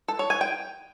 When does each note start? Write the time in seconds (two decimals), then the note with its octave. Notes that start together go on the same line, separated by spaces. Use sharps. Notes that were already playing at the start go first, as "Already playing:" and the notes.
0.08 A4
0.19 C#5
0.30 G#5
0.41 G5